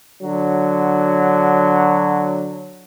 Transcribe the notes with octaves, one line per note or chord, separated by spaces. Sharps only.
D3 F#3